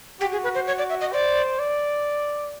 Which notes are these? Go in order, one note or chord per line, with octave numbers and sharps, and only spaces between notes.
F#4 G4
G#4
B4
C5
C#5
D5
E5
D#5
C5 D5
D5